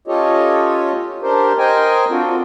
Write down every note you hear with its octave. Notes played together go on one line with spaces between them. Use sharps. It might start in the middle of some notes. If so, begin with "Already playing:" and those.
C#4 F4 G4 A4 C#5 D#5
D4 G4 A#4 C5
A#4 C5 D#5 G5 G#5
C4 D4 F4 F#4 A4